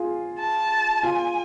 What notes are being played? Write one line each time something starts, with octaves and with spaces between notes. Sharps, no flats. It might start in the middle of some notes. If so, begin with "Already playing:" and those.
Already playing: F4 G#4
A5
F4 G#5